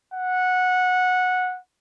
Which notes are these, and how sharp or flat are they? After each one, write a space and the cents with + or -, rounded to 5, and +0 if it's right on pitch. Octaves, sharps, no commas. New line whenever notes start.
F#5 -15